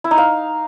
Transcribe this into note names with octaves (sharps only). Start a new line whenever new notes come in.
E4
D#4
F5